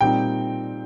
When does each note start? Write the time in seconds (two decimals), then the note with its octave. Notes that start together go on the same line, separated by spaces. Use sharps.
0.01 A#2 G3 C4 D#4 G5